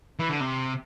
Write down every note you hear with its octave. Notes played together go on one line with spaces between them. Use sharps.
E3
D3
C3